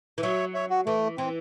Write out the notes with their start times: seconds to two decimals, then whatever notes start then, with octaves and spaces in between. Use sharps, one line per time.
0.18 E3
0.22 F#3 C#5 E5
0.54 C#5 E5
0.70 F#4
0.86 E3 A3
1.18 E3 C4